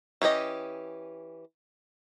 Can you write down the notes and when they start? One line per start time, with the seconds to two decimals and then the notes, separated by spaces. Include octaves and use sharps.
0.22 E3 C#4 G4 D#5